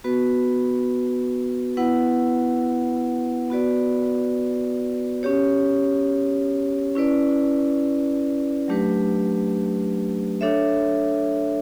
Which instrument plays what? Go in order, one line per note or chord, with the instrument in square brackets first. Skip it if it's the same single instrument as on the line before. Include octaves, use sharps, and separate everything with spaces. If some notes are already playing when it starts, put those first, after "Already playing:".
[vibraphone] B3 F#4 B4
B3 E4 B4 F#5
B3 F#4 B4 D5
C#4 G4 C#5
C#4 E4 B4 D5
F#3 A3 D4 G4 B4
D4 A4 C#5 E5